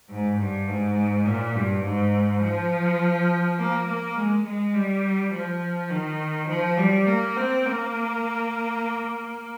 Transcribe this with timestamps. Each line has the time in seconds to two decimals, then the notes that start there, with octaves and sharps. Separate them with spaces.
0.10 G#2
0.39 G2
0.68 G#2
1.26 A#2
1.55 G2
1.84 G#2
2.42 F3
3.59 A#3
3.87 A#3
4.16 G#3
4.45 G#3
4.74 G3
5.33 F3
5.90 D#3
6.48 F3
6.78 G3
7.07 A#3
7.37 C4
7.66 A#3